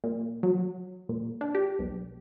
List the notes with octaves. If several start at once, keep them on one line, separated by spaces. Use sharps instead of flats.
A#2
F#3
A#2
D4
G4
B1